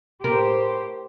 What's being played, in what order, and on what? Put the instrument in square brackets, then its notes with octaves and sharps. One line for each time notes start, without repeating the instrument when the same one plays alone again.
[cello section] A2 G4 C5 [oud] A#4